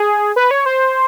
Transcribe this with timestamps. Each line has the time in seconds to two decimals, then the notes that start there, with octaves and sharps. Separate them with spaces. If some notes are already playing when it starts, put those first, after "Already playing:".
Already playing: G#4
0.36 B4
0.51 C#5
0.66 C5